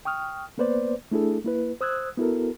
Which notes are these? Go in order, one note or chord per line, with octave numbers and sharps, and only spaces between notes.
G5 C#6 D#6 F6
A#3 B3 B4 C5 D5
A3 D4 E4 G#4 A4
A#3 E4 B4
C5 D#6 E6 F#6 G#6
B3 E4 F#4 A4 A#4